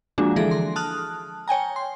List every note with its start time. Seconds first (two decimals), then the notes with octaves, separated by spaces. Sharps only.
0.18 F3 G#3 A#3 D4 F#4
0.36 D3 E3 G#4 A4 A#6 D7
0.51 C6
0.76 A5 D#6 F6 F#6
1.48 C#5 G5 G#5 A#5
1.76 C6